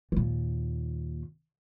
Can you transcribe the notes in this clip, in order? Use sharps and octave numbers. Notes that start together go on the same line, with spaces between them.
D#2 A#2